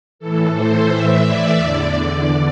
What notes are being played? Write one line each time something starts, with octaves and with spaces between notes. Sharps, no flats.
A2 E3 A4
C5
A2 E3 E5
D5
E2 D3
D5